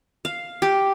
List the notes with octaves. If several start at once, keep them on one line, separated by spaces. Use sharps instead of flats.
F5
G4